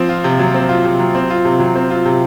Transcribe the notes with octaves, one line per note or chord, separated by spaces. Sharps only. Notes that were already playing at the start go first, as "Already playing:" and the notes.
Already playing: F3 C4
F4
C3
F#3
C4
F4
C3
F#3
C4
F4
C3
F#3
C4
F4
C3